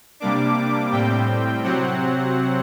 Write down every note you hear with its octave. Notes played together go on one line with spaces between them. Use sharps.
C3 G3 A#3 D4 D6
A2 G3 C4 G5
C3 F#3 C4 F#5